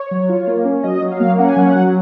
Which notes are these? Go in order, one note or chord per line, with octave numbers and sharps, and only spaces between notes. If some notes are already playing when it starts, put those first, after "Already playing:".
Already playing: C#5
F#3
F4
A#3
C#4
F#3 D#5
F#3
F5
A#3
C#4 F#5
G#5
F#3 F#5
F#3